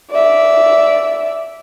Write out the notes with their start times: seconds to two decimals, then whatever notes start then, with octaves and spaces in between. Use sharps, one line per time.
0.11 D5 E5